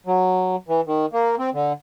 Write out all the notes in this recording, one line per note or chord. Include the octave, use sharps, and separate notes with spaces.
F#3
E3
D#3
A#3
C4
D3